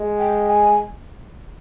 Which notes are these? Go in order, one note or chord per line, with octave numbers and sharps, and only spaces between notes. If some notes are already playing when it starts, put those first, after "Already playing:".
Already playing: G#3
G5
G#5